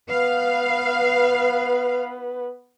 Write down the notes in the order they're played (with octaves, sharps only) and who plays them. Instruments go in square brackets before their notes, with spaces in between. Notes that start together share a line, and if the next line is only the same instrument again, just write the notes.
[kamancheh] B3 B4 [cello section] F5